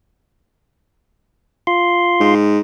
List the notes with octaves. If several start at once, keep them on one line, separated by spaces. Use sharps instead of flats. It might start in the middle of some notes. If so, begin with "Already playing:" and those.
F4 C6
G#2